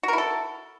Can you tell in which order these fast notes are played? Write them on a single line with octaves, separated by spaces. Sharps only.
F#4 A#4 E4 A4